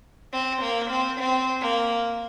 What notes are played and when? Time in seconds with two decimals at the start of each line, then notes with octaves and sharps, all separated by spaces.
0.33 C4
0.62 A#3
0.90 C4
1.19 C4
1.62 A#3